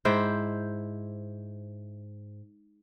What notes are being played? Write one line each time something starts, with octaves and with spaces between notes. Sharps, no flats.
G#2 E4 C5 G5